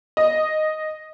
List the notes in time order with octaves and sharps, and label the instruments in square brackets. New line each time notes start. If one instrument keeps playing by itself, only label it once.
[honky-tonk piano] D#5